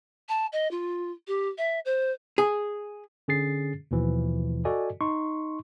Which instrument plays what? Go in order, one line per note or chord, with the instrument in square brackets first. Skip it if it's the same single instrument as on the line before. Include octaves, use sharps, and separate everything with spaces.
[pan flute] A5
D#5
F4
G4
E5
C5
[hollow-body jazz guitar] G#4
[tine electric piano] D3 C#4 G#4 A6 C7
D#2 B2 E3 F3
F#4 A4 D5 D#5 G#5
D#4 C6 C#6